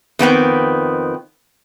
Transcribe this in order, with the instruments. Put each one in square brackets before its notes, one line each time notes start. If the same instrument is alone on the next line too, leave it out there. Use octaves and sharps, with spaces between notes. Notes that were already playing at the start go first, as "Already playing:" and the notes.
[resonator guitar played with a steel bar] F2 D#3 B3 C4